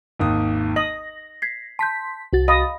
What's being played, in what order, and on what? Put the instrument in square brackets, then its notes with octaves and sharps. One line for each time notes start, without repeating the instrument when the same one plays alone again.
[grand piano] G#1 D#2 D#6
[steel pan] D#5 [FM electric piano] A#6 [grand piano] F#7
[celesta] G#6 B6 C7
[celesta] A5 G6 [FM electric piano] C6 B6
[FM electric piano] C2 F#4 A6
[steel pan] D#5 [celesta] F5 B5 D#6